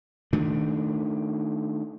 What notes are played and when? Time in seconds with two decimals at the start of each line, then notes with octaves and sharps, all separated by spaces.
0.33 D#3 A3 D4